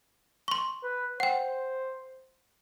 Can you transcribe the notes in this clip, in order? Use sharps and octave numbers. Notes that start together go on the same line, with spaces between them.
C6 C#6
B4
C5 F#5 G5